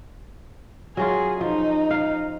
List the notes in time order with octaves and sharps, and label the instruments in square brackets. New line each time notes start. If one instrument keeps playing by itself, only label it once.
[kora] F#3 C#4 F4 [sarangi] G#4
[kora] F3 [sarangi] D#4
[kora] F5